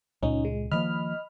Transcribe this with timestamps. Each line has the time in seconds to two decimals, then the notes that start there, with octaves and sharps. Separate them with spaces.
0.23 C#2 A#2 C#4 D#4
0.45 G#3
0.71 D#3 F3 A#3 D#5 B5 F6